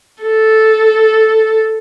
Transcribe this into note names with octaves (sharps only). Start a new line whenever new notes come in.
A4